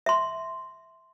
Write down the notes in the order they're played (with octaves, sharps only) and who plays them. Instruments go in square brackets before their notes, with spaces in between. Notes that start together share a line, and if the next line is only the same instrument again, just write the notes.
[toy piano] E5 C6